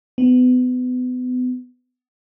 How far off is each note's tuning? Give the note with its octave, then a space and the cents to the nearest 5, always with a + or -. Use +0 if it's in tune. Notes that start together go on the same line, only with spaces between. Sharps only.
B3 +30